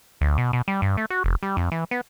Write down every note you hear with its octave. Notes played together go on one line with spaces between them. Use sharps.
D2
B2
B2
G3
G2
A3
F#4
F1
G3
F2
E3
B3